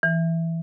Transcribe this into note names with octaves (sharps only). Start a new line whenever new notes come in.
E3